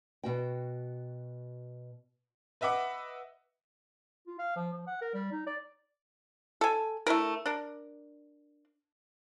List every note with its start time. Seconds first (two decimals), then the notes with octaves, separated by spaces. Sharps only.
0.24 B2 F#4 G5
2.61 B4 D#5 E5 F#5 D6
4.27 F4
4.39 F5
4.56 F3
4.73 F3
4.87 F#5
5.01 A#4
5.14 G3
5.32 D#4
5.47 D5
6.61 A4 G#5
7.07 A3 D4 E4 A#4
7.46 D4 A#4